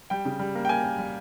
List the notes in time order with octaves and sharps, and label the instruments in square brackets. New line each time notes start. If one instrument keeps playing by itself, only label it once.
[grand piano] G3 G5
C#3
G3
A#3
G5
A#3 G#5
A#3
G3